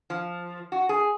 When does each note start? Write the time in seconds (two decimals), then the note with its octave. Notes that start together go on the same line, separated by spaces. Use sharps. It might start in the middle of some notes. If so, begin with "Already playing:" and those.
0.10 F3
0.72 F#4
0.89 G#4